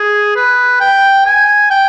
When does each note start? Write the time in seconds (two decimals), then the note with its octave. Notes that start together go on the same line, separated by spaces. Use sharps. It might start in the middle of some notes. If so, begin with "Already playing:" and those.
Already playing: G#4
0.36 B4
0.81 G5
1.26 G#5
1.71 G5